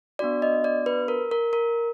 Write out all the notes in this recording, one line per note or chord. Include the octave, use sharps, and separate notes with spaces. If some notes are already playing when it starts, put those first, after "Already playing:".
B3 D4 F#4 D5
D#5
D5
B4
A#4
A#4
A#4